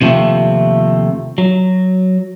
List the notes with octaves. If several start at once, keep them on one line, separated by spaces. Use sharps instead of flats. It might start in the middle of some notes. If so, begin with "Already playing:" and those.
D#2 C3 F3 G#3 A3 C4
F#3